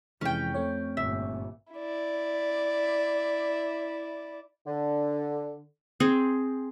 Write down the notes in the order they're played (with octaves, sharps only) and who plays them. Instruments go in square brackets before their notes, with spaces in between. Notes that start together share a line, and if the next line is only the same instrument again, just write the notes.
[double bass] F2 [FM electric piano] C3 E3 G#3 [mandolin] C#4 G5
[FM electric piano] A3 C4 C#5
[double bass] G1 A#2 [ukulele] E5
[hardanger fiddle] E4 D5
[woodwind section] D3
[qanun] C4 G#4